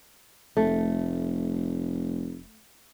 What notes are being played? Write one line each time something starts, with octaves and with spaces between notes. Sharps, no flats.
F1 A3